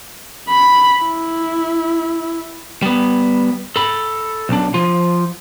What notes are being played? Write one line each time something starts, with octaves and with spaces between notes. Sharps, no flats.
B5
E4
G3 B3
A4 B5
B1 D4
F3 F4